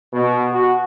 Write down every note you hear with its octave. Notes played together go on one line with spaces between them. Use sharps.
B2
F#4